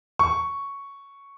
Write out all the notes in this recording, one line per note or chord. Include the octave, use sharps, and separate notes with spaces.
C#6